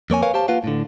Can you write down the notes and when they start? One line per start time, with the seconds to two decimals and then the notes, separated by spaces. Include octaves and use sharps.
0.10 F2 A#3 C#5 G#5
0.22 A#4 B4 C#5 F5 G#5
0.34 G4 C5 F5 A5
0.48 A#3 F4 B4 F5 F#5
0.64 A2 D3